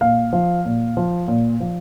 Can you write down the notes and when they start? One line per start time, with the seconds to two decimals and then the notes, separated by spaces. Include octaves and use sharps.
0.01 A#2 F5
0.33 F3
0.65 A#2
0.97 F3
1.28 A#2
1.60 F3